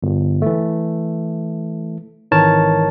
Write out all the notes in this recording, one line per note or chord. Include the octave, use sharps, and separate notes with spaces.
G1
E3 A3
G#1 D#3 E3 A#4 C#5 A5